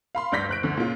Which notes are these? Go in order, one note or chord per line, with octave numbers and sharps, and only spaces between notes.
F5 B5 C6
D2 G2 D5 G6 A#6 B6
F#1 F#6 D7
D2 D3
A#2 C#3 F4